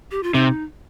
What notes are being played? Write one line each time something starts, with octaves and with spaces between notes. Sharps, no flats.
G4
F4
C3 D#4